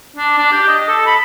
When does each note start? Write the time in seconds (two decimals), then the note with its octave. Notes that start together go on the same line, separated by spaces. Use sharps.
0.17 D4
0.38 D4
0.52 G4
0.68 D#5
0.89 A4
1.06 B5